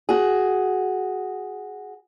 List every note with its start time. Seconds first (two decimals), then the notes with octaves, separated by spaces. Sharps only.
0.09 F#4 G#4